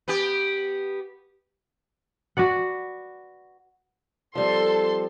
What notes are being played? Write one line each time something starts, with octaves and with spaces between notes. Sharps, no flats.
B3 G4
F#4 B4 D5 F#5
F3 G3 C4 A4 C6